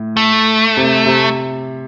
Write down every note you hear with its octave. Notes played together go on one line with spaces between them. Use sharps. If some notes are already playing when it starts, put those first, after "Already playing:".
Already playing: A2
A3
C3
C3